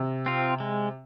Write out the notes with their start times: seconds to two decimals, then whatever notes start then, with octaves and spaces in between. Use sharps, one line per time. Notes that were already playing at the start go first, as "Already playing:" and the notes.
Already playing: C3
0.26 C4 F4
0.60 G#3